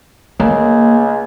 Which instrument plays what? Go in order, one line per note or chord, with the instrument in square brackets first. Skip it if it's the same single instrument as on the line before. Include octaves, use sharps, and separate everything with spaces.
[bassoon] C#2 [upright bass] A#3